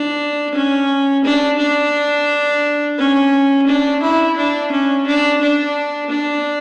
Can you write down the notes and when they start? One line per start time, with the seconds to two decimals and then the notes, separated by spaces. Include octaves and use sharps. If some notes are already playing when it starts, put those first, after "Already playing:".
Already playing: D4
0.54 C#4
1.24 D4
1.59 D4
2.98 C#4
3.67 D4
4.02 E4
4.36 D4
4.71 C#4
5.07 D4
5.41 D4
6.10 D4